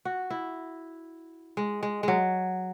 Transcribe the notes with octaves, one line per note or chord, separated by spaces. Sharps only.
F#4
E4
G#3
G#3
F#3 G#3